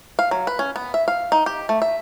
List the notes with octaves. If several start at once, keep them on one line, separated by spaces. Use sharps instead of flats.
F5
F#3
B4
C#4
B3
E5
F5
D#4
G4
A3
E5